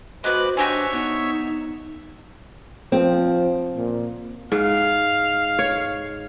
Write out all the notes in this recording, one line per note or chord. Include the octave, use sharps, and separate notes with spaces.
G#3 B3 F#4 B4 C5 D6 F#6
D4 F#4 G4 C5 C#5 E5 G#5
B3 D#4
F3 C4
A#2
G#2 F5
C#5